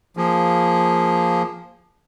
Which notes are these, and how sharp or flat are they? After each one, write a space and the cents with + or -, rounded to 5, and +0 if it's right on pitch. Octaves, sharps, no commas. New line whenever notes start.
F3 +0 A#3 +0 G#4 -10